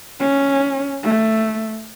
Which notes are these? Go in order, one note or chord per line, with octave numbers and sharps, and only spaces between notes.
C#4
A3